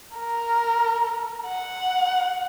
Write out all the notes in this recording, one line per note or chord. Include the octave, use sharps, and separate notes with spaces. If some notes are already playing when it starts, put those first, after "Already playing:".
A#4
F#5